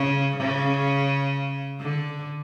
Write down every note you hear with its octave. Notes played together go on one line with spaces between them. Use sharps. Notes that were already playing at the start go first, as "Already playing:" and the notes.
Already playing: C#3
C#3
D3